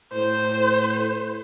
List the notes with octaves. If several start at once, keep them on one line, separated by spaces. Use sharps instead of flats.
A2 C5